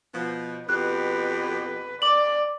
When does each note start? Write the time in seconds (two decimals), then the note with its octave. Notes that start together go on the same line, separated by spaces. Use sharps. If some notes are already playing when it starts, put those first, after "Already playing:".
0.14 B2 F3
0.69 F2 B2 G4 B4 F#6
2.02 D5 D6 F#7